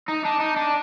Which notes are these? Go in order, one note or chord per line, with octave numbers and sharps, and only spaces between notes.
D#4
D4
D#4
D4